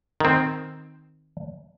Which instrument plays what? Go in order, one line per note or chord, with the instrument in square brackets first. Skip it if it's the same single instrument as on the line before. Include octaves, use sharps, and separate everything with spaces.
[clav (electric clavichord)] D#3 C4